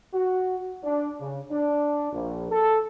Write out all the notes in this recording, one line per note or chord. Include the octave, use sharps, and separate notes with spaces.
F#4
D4
C#3
D4
A#1
A4